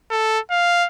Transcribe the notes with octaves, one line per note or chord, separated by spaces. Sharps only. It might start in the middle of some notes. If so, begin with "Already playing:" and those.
A4
F5